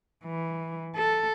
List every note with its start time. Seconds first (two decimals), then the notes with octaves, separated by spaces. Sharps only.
0.25 E3
0.96 A4